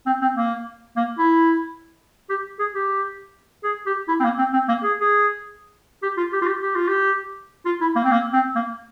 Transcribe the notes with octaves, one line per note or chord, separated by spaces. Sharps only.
C4
C4
A#3
A#3
E4
G4
G#4
G4
G#4
G4
E4
C4
A#3
C4
C4
A#3
G#4
G#4
G4
F4
G4
F4
G4
G4
F4
G4
F4
E4
A#3
C4
A#3
C4
A#3